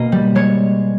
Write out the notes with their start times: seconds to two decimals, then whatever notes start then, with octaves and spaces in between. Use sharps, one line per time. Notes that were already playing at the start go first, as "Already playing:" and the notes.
Already playing: B2 A#3 C#4 D#5
0.12 G3
0.35 G#3 C#5